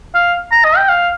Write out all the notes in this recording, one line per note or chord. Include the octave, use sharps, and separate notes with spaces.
F5
A#5
D#5
G5
F5